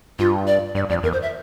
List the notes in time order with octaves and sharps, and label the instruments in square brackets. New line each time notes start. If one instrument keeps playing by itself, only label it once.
[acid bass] G2 [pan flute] F4
[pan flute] D5
[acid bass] G2 [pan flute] D5
[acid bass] F2 [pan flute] D5
[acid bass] E2 [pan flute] A#4
[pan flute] C5
E5